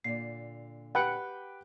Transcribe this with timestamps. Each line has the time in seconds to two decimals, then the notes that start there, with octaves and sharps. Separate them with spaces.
0.04 A#2 D3 D5 C7
0.95 G4 B4 F#5 G5 B5